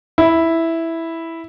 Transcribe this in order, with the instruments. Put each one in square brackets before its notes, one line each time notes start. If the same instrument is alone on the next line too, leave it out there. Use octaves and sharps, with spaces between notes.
[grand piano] E4